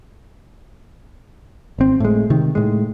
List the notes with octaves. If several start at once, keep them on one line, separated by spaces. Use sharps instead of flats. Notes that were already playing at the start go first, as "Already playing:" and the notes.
G#1 C4
A2 G#3
C3 D#3
A2 G#3